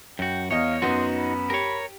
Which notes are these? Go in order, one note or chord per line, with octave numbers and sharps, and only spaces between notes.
F#2 F#4 G5
E2 C#5 D#5 F5
F#2 B3 D#4 F#4 C6
B5
G4 A#4 C#5